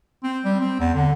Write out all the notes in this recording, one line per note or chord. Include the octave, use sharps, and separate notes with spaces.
C4
G3
C4
E2
D3